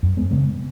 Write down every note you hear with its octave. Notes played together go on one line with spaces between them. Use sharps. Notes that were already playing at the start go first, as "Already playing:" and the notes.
F#2
G#3 B3
C#3 G#3 B3